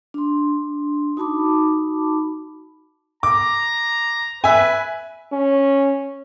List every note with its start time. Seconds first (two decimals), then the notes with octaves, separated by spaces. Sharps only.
0.14 D4 C6
1.17 D#4 F#4 A5 B5 D6
3.23 A#5 D6
4.44 B4 E5 G#5
5.32 C#4